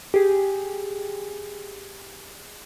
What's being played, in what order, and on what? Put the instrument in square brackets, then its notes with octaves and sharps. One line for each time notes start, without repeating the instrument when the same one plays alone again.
[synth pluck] G4 G#4